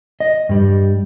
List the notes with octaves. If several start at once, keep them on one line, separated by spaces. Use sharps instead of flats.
D#5
G2 G3